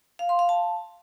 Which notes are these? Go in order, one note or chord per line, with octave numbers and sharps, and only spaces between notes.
F5
C6
F5
A5